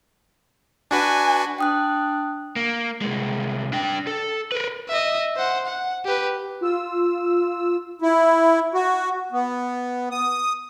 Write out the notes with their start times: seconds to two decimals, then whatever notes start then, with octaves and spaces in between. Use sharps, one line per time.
0.91 D4 F#4 B4 G#5
1.59 D4 G5 D#6 F#6
2.56 A#3
3.01 C2 G#3
3.72 D4 G5
4.07 A4
4.52 A#4 B4
4.88 D#5 E5
5.36 C5 F#5
5.66 F#5
6.05 G4 B4
6.61 F4 E6
8.02 E4
8.74 F#4
9.32 B3
10.11 D#6